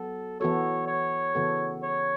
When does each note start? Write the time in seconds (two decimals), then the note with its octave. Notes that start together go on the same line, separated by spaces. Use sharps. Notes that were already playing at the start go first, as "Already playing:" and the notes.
Already playing: F#3 B3 A4
0.40 E3 B3 F#4 A4 C#5
0.88 C#5
1.35 C#3 E3 B3 F#4 A4
1.83 C#5